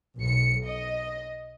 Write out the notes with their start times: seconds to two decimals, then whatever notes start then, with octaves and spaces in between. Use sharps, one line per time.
0.18 B1 C#7
0.66 D#5